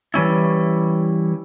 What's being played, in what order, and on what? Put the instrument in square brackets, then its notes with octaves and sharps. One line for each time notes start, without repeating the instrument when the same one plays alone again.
[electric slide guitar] E3 G3 C#4 E4